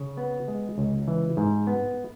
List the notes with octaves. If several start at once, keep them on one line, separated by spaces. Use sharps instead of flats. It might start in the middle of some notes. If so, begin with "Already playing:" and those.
Already playing: C#3
B3
G#3
C#2
E3
G#2
B3